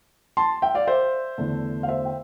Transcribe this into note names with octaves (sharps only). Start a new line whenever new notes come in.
A5 C6
E5 G5
D5 F5
C5 E5
E2 D3 A3
F5
C5 E5
G5